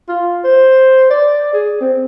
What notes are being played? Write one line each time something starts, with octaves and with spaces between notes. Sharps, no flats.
F4
C5
D5
G#4
C4